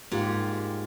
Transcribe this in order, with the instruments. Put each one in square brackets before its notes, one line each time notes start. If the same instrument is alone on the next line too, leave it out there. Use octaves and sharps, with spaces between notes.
[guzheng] G#2 [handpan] A#3 F4 G4